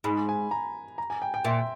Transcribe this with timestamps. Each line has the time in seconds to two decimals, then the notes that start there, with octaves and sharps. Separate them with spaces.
0.04 G#2 B5
0.29 G#5
0.51 A#5
0.98 A#5
1.10 G#5
1.22 G5
1.34 G5
1.44 A#2 E5